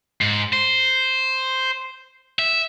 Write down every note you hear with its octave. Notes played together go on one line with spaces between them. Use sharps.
G#2
C5
E5